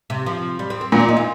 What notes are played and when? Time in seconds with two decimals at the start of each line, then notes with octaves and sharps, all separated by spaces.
0.10 C3
0.26 F3
0.59 G3
0.70 C4
0.81 C4
0.92 A#2 A#3
1.00 C4
1.09 D#4
1.17 F4